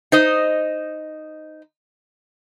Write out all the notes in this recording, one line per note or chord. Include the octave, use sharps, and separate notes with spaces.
D#4 C5 D#5